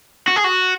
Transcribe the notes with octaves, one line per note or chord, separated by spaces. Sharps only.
F#4
G#4
F#4